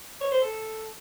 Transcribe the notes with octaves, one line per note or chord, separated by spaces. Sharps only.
C#5
C5
A4